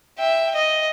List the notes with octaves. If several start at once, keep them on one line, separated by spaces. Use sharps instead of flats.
E5 G5
D#5